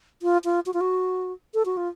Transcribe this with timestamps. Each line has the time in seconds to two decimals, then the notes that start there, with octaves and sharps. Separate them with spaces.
0.22 F4
0.45 F4
0.66 F#4
0.74 F4
0.81 F#4
1.54 A4
1.65 F#4
1.77 F4